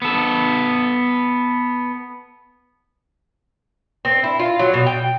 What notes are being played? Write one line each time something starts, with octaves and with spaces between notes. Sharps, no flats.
B3 A4
C4
E4
F4
F#3
B2
G5